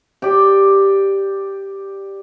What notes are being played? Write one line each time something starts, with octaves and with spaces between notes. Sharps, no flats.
G4 D5 G5